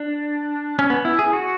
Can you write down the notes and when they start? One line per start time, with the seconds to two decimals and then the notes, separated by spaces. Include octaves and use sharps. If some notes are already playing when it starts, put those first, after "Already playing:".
Already playing: D4
0.79 C#4
0.90 B3
1.05 E4
1.19 G#4
1.33 F#4